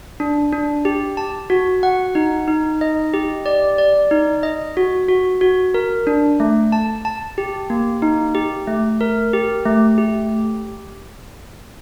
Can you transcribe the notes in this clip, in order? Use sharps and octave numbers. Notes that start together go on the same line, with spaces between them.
D4
D4
G4
A5
F#4
F#5
D#4
D#4
D#5
G4
D5
D5
D#4
D#5
F#4
F#4
F#4
A#4
D4
A3
A5
A5
G4
A#3
D#4
G4
A3
A#4
G4
A3
G4